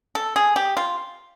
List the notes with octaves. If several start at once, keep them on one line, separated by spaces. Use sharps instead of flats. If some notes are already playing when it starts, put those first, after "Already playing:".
A4
G#4
G4
F4